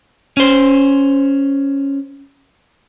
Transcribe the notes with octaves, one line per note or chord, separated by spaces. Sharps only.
C#4 C5